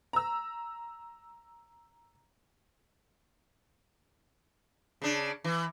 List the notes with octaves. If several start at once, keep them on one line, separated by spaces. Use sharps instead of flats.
A#5 E6
C#3 D4
E3